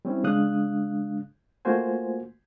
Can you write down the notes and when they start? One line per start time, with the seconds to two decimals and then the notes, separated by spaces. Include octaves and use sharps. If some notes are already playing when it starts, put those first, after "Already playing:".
0.05 G3 C4 C#4 E4
0.24 C#3 G#3 D4 F5 D#6 F#6
1.65 A3 A#3 F4 F#4 C5 G#5